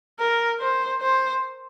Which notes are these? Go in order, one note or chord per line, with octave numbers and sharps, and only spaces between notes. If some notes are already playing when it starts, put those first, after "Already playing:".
A#4
C5
C5